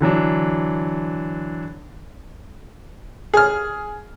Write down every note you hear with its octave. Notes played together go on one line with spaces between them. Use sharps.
D3 E3 F#3 D4
G#4 F6